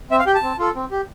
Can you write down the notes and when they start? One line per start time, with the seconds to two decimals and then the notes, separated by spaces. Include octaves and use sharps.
0.11 C4 E5
0.19 F5
0.26 G4 G5
0.35 A5
0.43 C4
0.59 F4 A4
0.75 C4
0.91 G4